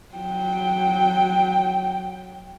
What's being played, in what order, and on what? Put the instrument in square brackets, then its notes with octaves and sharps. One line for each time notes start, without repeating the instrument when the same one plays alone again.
[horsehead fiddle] F#3 G5